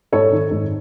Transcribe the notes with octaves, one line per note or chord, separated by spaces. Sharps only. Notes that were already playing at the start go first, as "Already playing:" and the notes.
G#2 A4 C#5
D#3
G#2